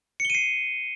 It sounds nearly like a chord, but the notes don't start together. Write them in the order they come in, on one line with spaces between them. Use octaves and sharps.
C#7 G7 D#7 C7